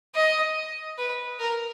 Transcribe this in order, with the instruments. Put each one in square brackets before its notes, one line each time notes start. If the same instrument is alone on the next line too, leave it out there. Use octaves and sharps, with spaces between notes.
[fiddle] D#5
B4
A#4